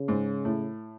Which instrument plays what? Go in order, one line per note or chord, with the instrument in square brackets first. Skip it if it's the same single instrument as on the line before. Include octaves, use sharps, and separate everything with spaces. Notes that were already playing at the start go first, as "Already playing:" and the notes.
Already playing: [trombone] C#3
[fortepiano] G#2
A2